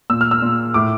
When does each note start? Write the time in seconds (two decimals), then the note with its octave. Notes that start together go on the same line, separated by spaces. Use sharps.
0.10 A#2 E6
0.21 F6
0.31 E6
0.42 A#2
0.74 A2 D6